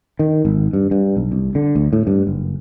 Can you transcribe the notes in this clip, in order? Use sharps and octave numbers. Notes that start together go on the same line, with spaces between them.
D#3
G#1
G2
G2
B1
C2
D3
D2
A2
G2
F#1